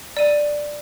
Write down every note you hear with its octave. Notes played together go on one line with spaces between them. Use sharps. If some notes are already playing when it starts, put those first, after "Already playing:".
D5 D#7